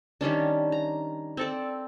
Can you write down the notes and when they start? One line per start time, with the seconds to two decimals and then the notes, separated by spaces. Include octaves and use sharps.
0.21 D#3 G3 C#4 D4
0.72 A#5
1.37 C4 A4 D5